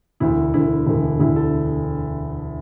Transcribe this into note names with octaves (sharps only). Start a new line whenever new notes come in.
E1 D2 D3 E4
E1 D2 D3 E4
E1 D2 D3
E1 D2 D3 E4
A4